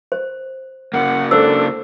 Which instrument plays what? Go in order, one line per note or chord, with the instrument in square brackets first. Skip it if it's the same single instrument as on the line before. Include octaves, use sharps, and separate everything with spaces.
[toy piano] C5
[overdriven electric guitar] C#3 A#3 [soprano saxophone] F#5
[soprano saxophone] D4 [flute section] A4 [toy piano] C5 E6